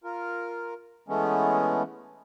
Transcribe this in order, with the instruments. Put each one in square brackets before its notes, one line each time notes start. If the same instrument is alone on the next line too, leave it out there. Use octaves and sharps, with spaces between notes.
[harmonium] F4 A#4
E3 G#3 A3 B3 C#4